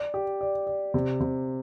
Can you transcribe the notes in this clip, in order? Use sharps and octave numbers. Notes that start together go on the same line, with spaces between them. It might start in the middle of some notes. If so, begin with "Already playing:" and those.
Already playing: D5
G4
D5
D5
C3
C3